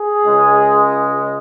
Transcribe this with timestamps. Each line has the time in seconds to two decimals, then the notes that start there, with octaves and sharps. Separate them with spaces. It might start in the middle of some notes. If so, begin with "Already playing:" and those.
Already playing: G#4
0.24 C#2 C#3 G#3